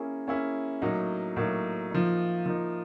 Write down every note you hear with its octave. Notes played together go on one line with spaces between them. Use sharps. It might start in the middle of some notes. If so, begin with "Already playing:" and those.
Already playing: A#3 C#4 E4 G#4
A#3 C#4 E4 G#4
A2 F#3 A#3 D#4
A2 F#3 A#3 D#4
F3 A#3 D#4
F3 A#3 D#4